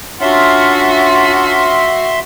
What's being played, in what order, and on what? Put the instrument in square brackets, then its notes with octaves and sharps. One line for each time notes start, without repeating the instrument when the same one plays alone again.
[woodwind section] C#4 D4 F4 [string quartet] F#4 [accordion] E5 C6